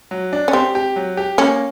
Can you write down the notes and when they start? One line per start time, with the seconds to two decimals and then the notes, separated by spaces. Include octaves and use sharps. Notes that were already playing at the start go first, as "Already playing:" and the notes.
0.11 F#3
0.33 D4
0.48 C#4
0.53 C4 G4
0.75 G4
0.96 F#3
1.17 G4
1.38 A#3 C#4